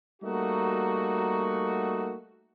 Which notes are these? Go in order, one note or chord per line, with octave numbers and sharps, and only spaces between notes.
G3 A3 A#3 D#4 F#4